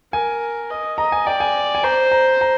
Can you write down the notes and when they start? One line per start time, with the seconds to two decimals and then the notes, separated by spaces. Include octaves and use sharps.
0.13 A#4 G#5
0.70 D#5
0.98 D#5 A#5
1.12 G#5
1.27 D5 G5
1.40 G#5
1.75 G#5
1.83 C5 A#5
2.11 A#5
2.41 A#5